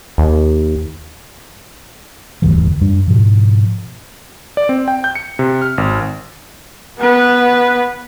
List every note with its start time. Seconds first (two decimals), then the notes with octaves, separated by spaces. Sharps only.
0.18 D#2
2.42 E1 D2 G2 E3
2.81 F#2 G3 D4
3.07 G#2 B2 F3
4.57 D5
4.69 C4
4.88 G5
5.04 G6
5.15 C#7
5.39 C3
5.62 F6
5.78 G#1
6.98 B3 B4